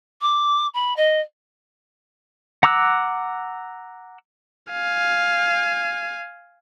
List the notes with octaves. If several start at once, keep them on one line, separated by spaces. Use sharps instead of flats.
D6
B5
D#5
F#5 A#5 D6 E6 F#6
F5 G#5